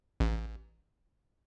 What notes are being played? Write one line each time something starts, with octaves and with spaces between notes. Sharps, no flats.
A1